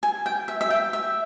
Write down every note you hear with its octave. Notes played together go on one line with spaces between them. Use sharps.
G#5
G5
E5
E5
G5
E5